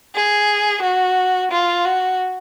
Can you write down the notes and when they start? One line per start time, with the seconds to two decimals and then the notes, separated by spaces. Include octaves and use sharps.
0.15 G#4
0.82 F#4
1.52 F4
1.85 F#4